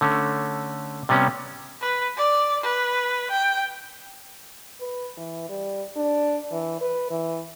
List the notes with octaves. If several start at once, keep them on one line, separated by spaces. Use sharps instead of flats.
D3 A3 C#4
C3 G3 B3 C#4
B4
D5
B4
G5
B4
E3
G3
D4
E3
B4
E3